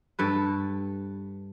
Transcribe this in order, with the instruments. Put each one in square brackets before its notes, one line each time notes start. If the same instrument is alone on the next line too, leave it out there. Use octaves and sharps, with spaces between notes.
[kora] G2 A4 B4